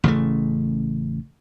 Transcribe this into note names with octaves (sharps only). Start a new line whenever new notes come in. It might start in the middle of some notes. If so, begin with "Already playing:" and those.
A1 C#3 E3 A3